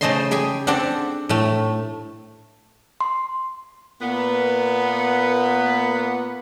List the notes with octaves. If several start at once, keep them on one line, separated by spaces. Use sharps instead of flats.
C#3 A3 C5 D#5 A5 C6
G4 G#4 G5 G#5
C4 D4 G4 A4 F#5
A2 A3
C6
A#2 A#3 B3